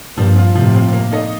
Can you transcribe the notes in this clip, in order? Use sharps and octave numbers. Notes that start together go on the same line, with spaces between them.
G2 A#2 F3
C4 F4
A2 C3 F3
C4 F4
A#3
D#4 A4 D#5